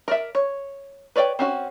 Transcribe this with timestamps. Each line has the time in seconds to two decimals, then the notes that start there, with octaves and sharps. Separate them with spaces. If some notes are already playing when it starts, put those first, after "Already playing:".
0.08 A#4 D5 E5
0.35 C#5
1.16 B4 C#5 D5 F5 G5
1.39 C4 C#4 F#4